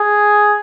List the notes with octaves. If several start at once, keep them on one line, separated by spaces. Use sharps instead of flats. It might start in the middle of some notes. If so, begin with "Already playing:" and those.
Already playing: G#4